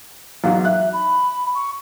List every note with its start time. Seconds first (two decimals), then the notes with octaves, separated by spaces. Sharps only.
0.44 E2 G#2 F#3 F5
0.65 E5 F#6
0.93 B5
1.55 C#6